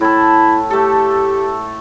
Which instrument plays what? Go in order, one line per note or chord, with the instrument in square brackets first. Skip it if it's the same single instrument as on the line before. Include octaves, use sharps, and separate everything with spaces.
[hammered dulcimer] A2 A4 [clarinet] E4
[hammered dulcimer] A3 A4 [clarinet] G4